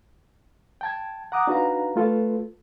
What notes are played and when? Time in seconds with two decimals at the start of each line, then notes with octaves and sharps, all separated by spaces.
0.81 G5 A5 G#6
1.32 F#5 A#5 D6 D#6 F#6
1.47 D4 D#4 F#4 B4 F5 A#5
1.96 A3 F4 A4 B4